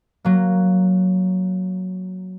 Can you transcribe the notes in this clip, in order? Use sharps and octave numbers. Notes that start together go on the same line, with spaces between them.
F#3 A#3